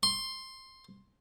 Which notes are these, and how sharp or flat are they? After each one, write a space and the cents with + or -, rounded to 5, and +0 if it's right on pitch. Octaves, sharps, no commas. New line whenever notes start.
C6 +10